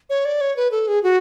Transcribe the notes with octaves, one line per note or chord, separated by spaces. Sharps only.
C#5
D5
C#5
B4
A4
G#4
F#4